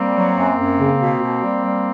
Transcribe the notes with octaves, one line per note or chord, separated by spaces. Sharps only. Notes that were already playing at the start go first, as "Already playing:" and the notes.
Already playing: G3 A#3 C4
F#3
F#2
F#2
C#3
B2
B2
G3
G3